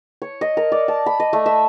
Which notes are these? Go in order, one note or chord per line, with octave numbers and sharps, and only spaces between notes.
C#5
D#5
A#4
D5
A5
B5
D#5
A3
E5